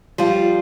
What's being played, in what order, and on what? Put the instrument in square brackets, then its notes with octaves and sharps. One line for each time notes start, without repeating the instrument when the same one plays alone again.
[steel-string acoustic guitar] F3 G3 F4